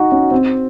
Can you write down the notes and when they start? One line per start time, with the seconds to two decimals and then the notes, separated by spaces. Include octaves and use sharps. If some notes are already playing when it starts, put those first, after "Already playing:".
Already playing: D#4 F#4
0.12 C#4
0.31 C4